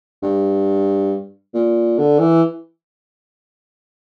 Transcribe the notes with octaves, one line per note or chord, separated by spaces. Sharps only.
G2
A#2
D3
E3